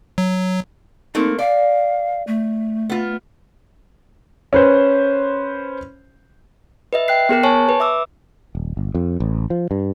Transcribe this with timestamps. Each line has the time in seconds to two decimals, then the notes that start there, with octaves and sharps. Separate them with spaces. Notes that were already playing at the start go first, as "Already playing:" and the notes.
0.18 F#3
1.15 A3 A#3 C4 D#4
1.39 D5 F5
2.27 A3
2.89 B3 F4
4.53 C#4 B4 C5
6.93 B4 D#5 E5
7.08 G5 F#6 C7
7.29 B3 G#4 A#4 F#6
7.43 C#5 G#5 A5 C#6
7.69 B4
7.80 E5 D6 E6
8.55 D#1
8.77 G1
8.95 F2
9.20 A1
9.50 F3
9.71 G2